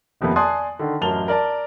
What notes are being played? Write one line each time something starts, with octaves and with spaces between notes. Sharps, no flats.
D#1 F2 C3 A#3 B3
D5 G#5 A5 C6 D#6 F#6
D3 D#3
A1 F#2 A#4 A5 F7 G7
A#4 D5 A5